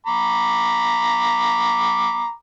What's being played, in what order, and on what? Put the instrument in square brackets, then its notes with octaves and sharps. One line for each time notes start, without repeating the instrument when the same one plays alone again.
[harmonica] A#5 B5 D6